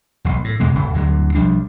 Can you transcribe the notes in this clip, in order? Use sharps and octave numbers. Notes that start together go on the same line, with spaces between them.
E1 B1
A2
E2 B2 G#3 A#3
D1 G1 C#3
D2 G2 D3 F#3
B1 F3 G3 D4